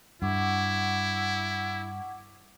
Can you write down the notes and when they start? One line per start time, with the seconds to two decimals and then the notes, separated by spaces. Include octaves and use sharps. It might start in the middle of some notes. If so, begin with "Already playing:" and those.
0.22 G2 E4 F#5 C#6 D6